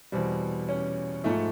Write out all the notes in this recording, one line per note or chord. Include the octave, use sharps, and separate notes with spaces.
E2 B2 G3 C4
C#4
G#2 F3 A3